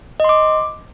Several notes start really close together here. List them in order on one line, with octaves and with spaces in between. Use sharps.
D#5 C6 D6